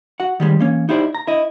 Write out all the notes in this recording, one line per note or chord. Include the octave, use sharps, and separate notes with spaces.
F#4 F#5
D#3 G3 G#3
E3 A#3 C#4
D#4 E4 G4 C5 D5
A#5
E4 D#5